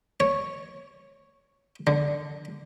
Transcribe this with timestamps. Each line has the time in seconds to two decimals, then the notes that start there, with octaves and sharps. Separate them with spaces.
0.20 C#5
1.87 D3